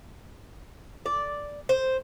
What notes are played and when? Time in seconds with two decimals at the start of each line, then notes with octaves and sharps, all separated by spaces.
1.06 D5
1.69 C5